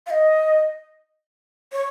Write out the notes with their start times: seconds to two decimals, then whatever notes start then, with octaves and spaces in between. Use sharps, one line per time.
0.07 F5
0.10 D#5
1.72 C#5